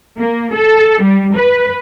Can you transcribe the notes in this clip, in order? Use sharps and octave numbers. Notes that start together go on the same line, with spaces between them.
A#3
A4
G3
B4